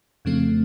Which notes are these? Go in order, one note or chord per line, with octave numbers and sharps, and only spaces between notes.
F2 C#3 F3 A3 C4